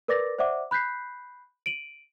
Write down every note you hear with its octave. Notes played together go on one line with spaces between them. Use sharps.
A#4 B4 D5 D6 A6 A#6
C5 D5 E5 F#5 D6
B5 F#6 G6 B6 C7
D7 D#7 F#7